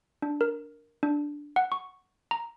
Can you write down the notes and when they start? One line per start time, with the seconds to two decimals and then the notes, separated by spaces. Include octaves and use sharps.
0.22 D4
0.41 A#4
1.03 D4
1.56 F#5
1.72 C#6
2.31 A#5